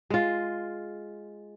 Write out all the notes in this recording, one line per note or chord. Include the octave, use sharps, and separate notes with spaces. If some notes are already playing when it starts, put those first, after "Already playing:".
G#3 F4